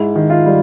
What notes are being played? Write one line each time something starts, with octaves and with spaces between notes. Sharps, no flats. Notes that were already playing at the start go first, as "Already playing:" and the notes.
Already playing: G#2 E4
D#3
F4
G3